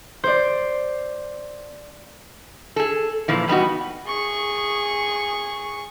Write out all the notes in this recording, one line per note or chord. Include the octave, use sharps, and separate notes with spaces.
C5 D5
G#4 A4
A#2 E3 F3
G3 B3 D#4 F#4
G#4 C#6